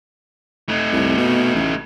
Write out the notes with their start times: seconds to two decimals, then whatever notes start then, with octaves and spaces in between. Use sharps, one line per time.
0.69 A3 D#4
0.92 C2
1.17 B2
1.55 A1